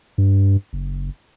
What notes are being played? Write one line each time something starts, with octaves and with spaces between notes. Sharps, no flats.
G2
F#1